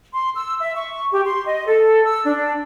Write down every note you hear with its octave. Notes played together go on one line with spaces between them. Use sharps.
C6
E6
E5
C#6
G4
C6
D#5
A4
E6
D4